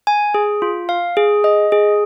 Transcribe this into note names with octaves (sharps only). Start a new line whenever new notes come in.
G#5
G#4
F4
F5
G#4
D#5
G#4